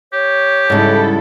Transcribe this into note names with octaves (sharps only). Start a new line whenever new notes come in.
G4 C#5
G#2 C#3 G3 E4 A4